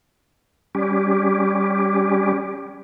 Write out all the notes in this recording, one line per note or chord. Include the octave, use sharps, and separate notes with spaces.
G3 C#4 G4